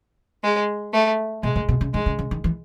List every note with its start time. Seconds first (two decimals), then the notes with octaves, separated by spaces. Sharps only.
0.43 G#3
0.94 A3
1.43 B2 G#3
1.56 A2
1.69 B2
1.81 C#3
1.94 D#3 G#3
2.06 C#3
2.19 C#3
2.31 D#3
2.44 E3